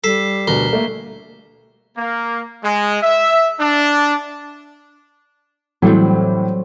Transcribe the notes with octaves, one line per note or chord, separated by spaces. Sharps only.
G3 A4 B6 C7 E7
D2 B2 A#4 G7
A3 A#3
A#3
G#3
E5
D4
A2 E3 F#3 G3 C4